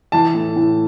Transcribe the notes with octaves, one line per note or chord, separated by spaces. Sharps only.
E3 A5
A2
A2